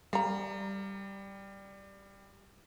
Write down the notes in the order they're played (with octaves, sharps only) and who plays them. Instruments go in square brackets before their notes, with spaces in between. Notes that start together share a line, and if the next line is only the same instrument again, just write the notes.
[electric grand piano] G3 [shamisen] F5 A#5